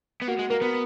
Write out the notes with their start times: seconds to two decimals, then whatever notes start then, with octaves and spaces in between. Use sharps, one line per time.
0.21 B3
0.28 A#3 F#4
0.39 G#3
0.50 A#3 A#4
0.61 B3 B4